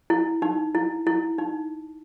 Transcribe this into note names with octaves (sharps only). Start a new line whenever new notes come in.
E4
D#4
E4
E4
D#4